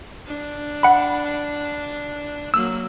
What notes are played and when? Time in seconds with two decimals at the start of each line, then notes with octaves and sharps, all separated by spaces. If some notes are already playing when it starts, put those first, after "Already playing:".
0.26 D4
0.83 F#5 B5
2.54 F#3 A#3 E6